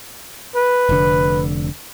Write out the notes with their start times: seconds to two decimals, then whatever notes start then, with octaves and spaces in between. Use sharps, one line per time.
0.55 B4
0.89 F1 D3